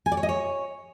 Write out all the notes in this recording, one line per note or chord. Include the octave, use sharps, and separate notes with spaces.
G#5
D5
C#5
D#5
C#5